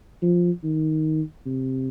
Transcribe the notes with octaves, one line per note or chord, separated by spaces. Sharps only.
F3
D#3
C3